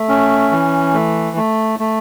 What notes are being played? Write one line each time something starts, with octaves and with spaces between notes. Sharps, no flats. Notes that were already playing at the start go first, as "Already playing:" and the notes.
Already playing: A3
C#4
E3
A3
A3
A3